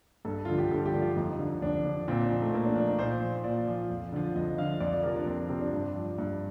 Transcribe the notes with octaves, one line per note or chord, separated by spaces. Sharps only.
G2 A4
D3 F3 F4
G4
G2 A4
F4
G4
D3 F3
F4
F2 D#4
D3 F3
F2 D4
D3 F3
A#2 C4
D4
F3 D#4
A3
A#2 A#3
D4
F3 D4
D#4
A#2 C5
F3
A#2 D5
F3
F2
D3 F3
F2 D#5
D3 F3 F5
F2 D5
D5
C3 F3 A#4
D4
F2 C4
C3 F3 C4
D4
G2
F3
G2